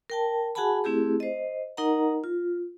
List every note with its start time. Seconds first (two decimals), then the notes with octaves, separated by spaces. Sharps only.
0.10 A#4 G5 A5
0.55 F#4 G#4 F#5 G#5 A5 B5
0.84 A3 C4 E4 G4 G#4
1.20 C5 D#5
1.77 D#4 A#4 D#5 F#5 A#5
2.24 F4